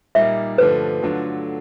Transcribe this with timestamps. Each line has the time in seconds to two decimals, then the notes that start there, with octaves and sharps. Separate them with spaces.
0.15 A#2 G3 A#3 D#4 E5
0.58 G2 D3 F3 A3 D4 B4
1.02 D3 F#3 A3 D4 F4